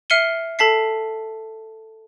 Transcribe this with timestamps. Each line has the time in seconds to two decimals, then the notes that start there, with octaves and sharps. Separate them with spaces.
0.10 E5 F6 C7 C#7 D#7 G7
0.59 A4 A5 B6 C7